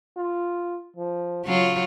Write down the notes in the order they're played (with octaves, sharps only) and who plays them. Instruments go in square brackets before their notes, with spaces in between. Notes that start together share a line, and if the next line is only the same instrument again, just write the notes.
[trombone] F4
F3
[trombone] C#3 [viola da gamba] F#3 F4